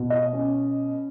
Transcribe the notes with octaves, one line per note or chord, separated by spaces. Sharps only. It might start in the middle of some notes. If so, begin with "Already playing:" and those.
Already playing: B2
D#5
C#4